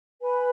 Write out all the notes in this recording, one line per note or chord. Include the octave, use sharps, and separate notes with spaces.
B4 G#5 B5